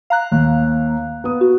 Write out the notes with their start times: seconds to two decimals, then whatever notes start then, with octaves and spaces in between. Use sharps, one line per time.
0.10 F5 A#5 F#6
0.32 D#2
1.24 B3 D#6
1.41 F#4